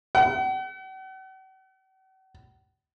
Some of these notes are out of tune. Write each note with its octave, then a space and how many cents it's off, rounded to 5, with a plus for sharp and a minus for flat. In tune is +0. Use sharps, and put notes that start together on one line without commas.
F#5 +45